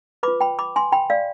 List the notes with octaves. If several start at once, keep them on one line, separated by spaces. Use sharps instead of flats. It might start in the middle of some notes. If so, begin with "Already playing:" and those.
F4 B4 B5 D6
G5 B5
B5 D6
G#5 C6
G5 B5
D5 F5